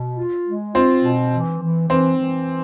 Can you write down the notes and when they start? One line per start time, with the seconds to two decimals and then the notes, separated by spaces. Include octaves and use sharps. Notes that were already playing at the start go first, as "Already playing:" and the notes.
Already playing: B2
0.18 F4
0.46 G#3
0.75 C4 F4
1.03 B2
1.32 E3
1.61 E3
1.89 E3 C4
2.19 E3